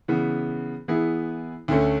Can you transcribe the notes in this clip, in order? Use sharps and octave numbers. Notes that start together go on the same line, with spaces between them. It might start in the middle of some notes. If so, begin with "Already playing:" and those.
C#3 E3 B3
E3 B3 E4 G#4
D2 D3 A3 C#4